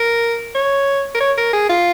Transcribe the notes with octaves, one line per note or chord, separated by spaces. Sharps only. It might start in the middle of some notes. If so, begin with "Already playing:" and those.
Already playing: A#4
C#5
A#4
C#5
A#4
G#4
F4